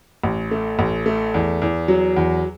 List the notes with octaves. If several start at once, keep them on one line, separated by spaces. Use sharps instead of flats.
A1
A3
A1
A3
E2
E2
F#3
E2